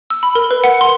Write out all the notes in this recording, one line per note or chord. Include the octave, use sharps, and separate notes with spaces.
E6
B5
A#4
B4
F#5
C6